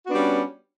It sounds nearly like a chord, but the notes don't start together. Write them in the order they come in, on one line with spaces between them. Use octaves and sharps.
F#4 B3 D4 G3 C#4